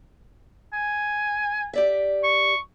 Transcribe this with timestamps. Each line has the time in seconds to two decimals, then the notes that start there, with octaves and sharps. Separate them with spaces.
0.73 G#5
1.73 G4 D5 E5
2.24 C#6